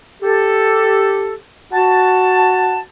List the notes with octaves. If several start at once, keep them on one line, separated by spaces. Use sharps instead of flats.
G4 A4
F#4 A5